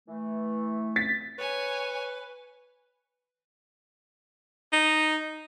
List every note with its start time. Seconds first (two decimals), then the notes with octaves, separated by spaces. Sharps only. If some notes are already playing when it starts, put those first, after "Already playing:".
0.08 E3 A3
0.96 A6 B6
1.39 B4 C#5 G#5
4.73 D#4